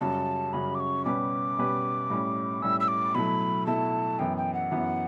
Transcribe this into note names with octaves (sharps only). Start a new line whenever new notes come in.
F#2 C#3 G3 C#4 F#4 A5
F#2 C#3 G3 C#4 F#4 B5
D6
C#6
B2 G3 C#4 G4 B4 D6
B2 G3 C#4 G4 B4
A2 G3 C#4
A2 G3 C#4 E6
E6
D6
B2 F#3 A3 E4 A4 B5
B2 F#3 A3 E4 A4 A5
F#2 E3 B3 G5
G5
F#5
F#2 E3 B3